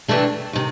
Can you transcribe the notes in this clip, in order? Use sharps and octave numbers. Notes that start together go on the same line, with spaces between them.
C3 E3 A3 D4
C3 D#3